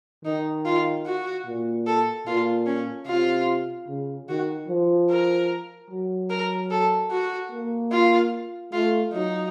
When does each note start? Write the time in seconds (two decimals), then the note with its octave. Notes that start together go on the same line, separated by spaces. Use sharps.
0.25 D#3 D#4
0.66 F4
1.06 F#4
1.46 A#2
1.87 A4
2.27 A#2 F4
2.67 C#4
3.07 C3 F4
3.88 C#3
4.29 D#3 F#4
4.68 F3
5.10 A#4
5.90 F#3
6.30 A#4
6.71 A4
7.11 F#4
7.52 A#3
7.92 F4
8.73 A3 F4
9.13 F#3 D#4